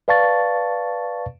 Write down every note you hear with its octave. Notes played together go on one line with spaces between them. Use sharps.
B4 D5 F5 A5 C#6 A6